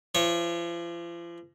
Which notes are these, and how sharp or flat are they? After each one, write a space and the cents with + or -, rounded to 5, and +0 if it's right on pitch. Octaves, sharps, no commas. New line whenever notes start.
F3 -40 C#5 -20